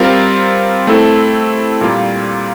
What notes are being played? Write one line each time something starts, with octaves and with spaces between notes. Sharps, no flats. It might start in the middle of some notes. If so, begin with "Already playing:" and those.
Already playing: G3 C4 F4 A#4
A3 C4 E4 A4
A#2 G3 A#3 F4